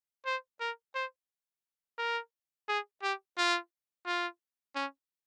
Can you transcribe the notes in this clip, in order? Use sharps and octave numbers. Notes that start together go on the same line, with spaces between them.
C5
A#4
C5
A#4
G#4
G4
F4
F4
C#4